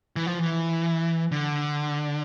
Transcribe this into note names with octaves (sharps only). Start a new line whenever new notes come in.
E3
F3
E3
D3